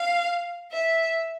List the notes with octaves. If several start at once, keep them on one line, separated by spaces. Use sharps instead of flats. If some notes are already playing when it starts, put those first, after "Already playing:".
Already playing: F5
E5